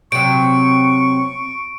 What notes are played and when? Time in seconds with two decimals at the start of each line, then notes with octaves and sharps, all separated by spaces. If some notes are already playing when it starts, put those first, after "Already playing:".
0.12 C3 F#3 C#6 D7